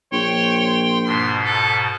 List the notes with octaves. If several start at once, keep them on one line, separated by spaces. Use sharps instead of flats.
A#1 C#5 G5 C6
G#2 B2 C6
A4